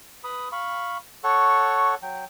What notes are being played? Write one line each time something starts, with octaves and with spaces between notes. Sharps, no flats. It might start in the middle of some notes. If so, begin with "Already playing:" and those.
B4 B5 D#6
F5 B5 C#6
A4 C#5 F#5 C#6
F#3 G5